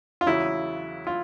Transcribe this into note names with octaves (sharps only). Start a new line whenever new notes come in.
F4
E2 C#3 F#3 E4
F4